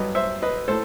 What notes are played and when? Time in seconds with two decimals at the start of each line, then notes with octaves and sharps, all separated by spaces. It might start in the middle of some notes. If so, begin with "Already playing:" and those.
Already playing: G2 F#3 B4 D#5
0.15 C5 E5
0.42 B4 D#5
0.68 A2 A4 C5